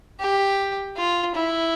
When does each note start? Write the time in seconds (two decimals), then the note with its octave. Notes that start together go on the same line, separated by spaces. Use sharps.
0.20 G4
0.97 F4
1.35 E4